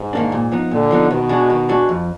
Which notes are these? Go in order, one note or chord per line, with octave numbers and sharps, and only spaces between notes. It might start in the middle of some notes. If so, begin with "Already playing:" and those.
Already playing: G#2
D#3 A#3 D4
A#2
F3 B3 D#4
A#2 D3
F3 B3 D#4
B2 D#3
G#3 D4 F#4
D#3
G#3 D4 F#4
F2